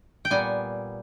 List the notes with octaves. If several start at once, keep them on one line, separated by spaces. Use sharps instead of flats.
G5
A#2 G3 B3 G#5